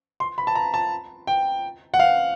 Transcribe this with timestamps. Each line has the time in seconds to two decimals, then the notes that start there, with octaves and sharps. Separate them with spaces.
0.20 C6
0.38 B5
0.47 A5
0.55 A#5
0.74 A5
1.27 G5
1.94 F#5
1.99 F5